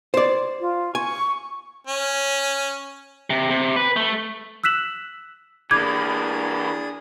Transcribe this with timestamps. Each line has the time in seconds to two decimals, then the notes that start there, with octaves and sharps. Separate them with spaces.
0.14 C5 D5
0.61 F4
0.95 G#5 C#6
1.87 C#4
3.30 C3
3.50 C3
3.76 B4
3.96 A3
4.64 E6 F#6 B6 E7 F#7
5.71 E3 A#3 D4 G#4 D6 D#6 G6 G#6